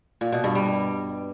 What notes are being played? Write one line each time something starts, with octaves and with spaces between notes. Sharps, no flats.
A#2
B2
G2
G3